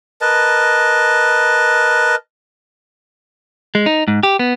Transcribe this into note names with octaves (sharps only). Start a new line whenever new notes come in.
A#4 B4 D#5 A5
G#3
D#4
G#2
G4
B3